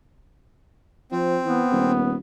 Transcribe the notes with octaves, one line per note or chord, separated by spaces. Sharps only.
F3 C4
E3 B3
D#1